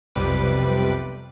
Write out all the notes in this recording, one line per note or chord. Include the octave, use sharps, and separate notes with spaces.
B1 F2 C3 G3 B4 D6